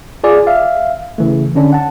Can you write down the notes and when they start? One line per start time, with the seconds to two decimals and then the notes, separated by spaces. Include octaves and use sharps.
0.24 F4 G#4 D5 G#5
0.47 E5 F5
1.18 C#3 E3 A3
1.55 D3 C#4 D4
1.73 F#5 A5